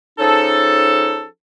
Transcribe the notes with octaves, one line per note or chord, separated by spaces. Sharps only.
F3 C#4 D#4 G#4 A4